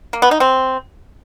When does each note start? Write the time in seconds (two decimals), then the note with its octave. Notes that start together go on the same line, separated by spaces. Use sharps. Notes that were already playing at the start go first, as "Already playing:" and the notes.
0.13 A#3
0.22 B3
0.31 D#4
0.40 C4